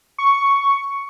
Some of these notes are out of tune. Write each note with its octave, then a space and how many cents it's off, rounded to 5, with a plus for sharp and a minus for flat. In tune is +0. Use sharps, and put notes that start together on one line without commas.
C#6 +5